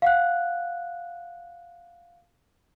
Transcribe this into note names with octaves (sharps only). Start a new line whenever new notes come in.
F5 F#5 F#6